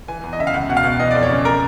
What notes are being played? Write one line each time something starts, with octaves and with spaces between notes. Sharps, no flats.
E3 G#5
E2
D#5
C#3 E5
F5
C#2 F#5
B2 F#5
F5
B2
E3 D#5
D5
F2
C#5
C#3
A#4